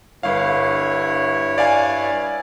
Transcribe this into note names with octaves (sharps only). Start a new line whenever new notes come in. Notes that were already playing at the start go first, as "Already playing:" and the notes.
G1 G2 E4 C#5 F5
D5 F5 G#5